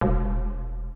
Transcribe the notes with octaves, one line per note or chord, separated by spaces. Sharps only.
E1